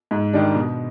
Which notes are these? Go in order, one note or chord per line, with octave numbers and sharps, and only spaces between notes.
G#2
D#3 G3 D4
B2